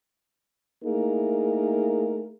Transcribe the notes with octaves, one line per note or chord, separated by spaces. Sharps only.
A3 A#3 D#4 E4 G#4 A#4